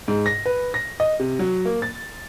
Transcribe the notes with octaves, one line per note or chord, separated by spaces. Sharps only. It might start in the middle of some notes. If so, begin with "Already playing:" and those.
G#2
A#6
B4
A#6
D#5
C3
F#3
A#3
A6